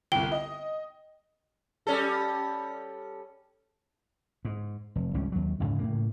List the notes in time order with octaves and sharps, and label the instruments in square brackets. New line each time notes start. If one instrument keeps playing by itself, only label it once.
[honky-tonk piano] G1 C2 [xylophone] G5 G7
[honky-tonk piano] D#5
[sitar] G3 C#4 A4
[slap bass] G#2
F1
G#1 C#2 G3 C#4
D#2 F#3
A1 D2 G#2 C#3
A2 C#3 A#3